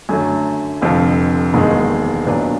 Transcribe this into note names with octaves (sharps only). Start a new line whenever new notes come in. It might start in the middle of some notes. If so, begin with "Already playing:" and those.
F#2 D3 F#3 A3 G#5
F1 F2 D3 F3
E1 D#2 D#3 G#3
B1 A#2 F#3 B3 D4